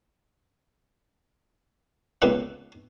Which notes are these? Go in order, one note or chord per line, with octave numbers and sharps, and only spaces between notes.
C#2 A#3 B3 D#4 B4 E5